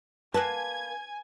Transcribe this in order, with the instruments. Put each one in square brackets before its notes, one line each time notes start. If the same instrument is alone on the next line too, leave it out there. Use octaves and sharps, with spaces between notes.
[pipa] A#3 F#5 A5 [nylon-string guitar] B4 [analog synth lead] G#5 [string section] G#6